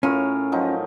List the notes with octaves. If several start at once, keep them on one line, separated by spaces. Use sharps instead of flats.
A2 C#4 F4 A#4
F3 F#3 D#4